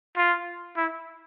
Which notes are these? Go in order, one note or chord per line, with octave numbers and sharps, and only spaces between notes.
F4
E4